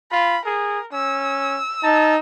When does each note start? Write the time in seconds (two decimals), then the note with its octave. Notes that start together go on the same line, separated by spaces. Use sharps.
0.12 F4 B5
0.45 G#4 A#4
0.92 C#4 E6
1.84 D#4 A5